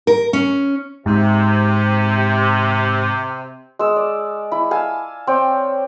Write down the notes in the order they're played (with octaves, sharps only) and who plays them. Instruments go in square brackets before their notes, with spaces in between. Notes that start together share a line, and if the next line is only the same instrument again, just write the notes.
[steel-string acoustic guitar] A#4
C#4
[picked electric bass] G#2 [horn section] C3
[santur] G#3 E6
D5
E4 B5
F5 G#5 A5 E6
C4 C#5 D5 G5